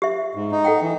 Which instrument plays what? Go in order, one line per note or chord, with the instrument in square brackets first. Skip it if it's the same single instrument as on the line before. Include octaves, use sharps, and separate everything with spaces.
[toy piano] G4 E5
[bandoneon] G#2
D#4
[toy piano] A4 F#5 G5
[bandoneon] E3